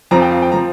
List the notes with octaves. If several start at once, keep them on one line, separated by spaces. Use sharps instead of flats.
F2 F3 C4 A#5
G5
F5
G5
F3 C4 A#5